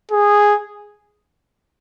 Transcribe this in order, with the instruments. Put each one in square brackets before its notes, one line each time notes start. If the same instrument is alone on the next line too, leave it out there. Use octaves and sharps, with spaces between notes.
[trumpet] G#4